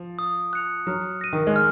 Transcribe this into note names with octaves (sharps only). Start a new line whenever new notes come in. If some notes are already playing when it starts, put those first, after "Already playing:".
Already playing: F3
D#6
F#6 C#7 F7
F#3 F6
A#6 D#7
D#3
G#3
F6